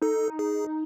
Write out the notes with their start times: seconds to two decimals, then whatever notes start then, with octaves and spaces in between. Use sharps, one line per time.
0.02 D#4 A4
0.39 G#4